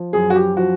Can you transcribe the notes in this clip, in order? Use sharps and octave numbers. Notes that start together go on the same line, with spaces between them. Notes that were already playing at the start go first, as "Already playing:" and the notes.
Already playing: F3
F#2 G#4
F#4
G4
F3 F#4